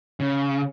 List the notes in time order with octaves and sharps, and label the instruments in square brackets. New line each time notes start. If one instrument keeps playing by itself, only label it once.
[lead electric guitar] C#3